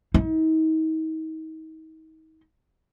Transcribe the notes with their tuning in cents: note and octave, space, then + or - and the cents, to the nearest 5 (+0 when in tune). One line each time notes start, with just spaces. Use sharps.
D#4 +35